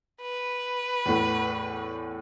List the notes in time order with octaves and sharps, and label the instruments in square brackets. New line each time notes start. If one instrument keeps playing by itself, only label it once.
[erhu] B4
[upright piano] E2 A2